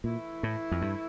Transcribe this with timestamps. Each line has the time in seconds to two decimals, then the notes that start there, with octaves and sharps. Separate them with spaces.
0.04 A#2 E3 A3 E4
0.43 A2
0.72 F2
0.82 G2